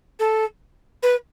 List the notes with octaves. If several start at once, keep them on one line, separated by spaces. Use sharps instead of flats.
A4
B4